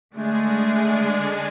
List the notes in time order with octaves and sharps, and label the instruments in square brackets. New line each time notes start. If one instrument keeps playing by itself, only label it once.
[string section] D3 G#3 D4 G#4 [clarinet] A3